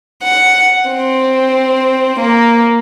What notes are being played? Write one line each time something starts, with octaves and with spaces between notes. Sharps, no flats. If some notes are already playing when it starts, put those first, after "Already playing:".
F#5
C4
A#3